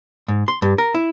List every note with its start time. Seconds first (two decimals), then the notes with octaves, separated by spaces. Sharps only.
0.28 G#2
0.48 C6
0.62 G2
0.78 A#4
0.94 E4